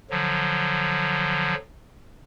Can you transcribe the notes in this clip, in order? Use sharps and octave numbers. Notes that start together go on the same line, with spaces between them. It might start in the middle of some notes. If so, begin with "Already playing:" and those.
D3 F3 F#3